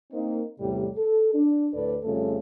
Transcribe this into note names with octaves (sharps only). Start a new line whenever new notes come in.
A#3 C4 D#4
E2 A2 C3 G3
A4
D4
D2 A2 A4 B4 D5
F2 C#3 G3 A3 F4 A4